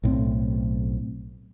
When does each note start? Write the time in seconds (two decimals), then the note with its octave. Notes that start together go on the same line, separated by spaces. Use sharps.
0.03 B1 A2 C4